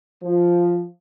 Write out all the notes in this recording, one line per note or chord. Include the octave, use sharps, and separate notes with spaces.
F3